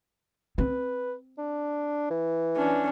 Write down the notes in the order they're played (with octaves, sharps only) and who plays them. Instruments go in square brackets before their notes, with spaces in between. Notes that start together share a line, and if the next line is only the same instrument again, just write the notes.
[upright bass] C4 [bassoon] B4
[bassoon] D4
E3
[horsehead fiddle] C#4 D4